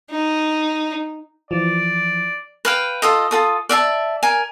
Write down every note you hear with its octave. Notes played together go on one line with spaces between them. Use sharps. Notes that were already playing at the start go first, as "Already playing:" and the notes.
D#4
E3 F3 D5
B4 F5 G5
F4 A4 D#5
F4 A4 D#6
D5 E5 F#5 A5
A#4 G#5